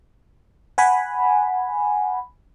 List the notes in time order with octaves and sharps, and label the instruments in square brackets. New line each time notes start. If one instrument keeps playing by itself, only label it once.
[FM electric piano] F#5 G#5 B5